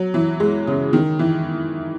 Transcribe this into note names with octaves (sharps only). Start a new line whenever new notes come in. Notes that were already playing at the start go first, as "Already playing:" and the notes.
Already playing: F#3
E3
G#3
C#3
D#3
E3